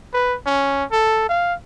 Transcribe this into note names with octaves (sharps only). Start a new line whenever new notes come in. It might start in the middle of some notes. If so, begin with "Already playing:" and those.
B4
C#4
A4
F5